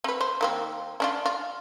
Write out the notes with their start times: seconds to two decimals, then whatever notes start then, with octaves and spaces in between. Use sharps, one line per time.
0.04 C4 B4
0.21 C5
0.41 D#3 A#3 C4
1.00 C#4 D4 F4
1.26 F4